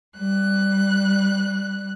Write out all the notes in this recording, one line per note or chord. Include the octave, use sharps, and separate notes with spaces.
G3 F#6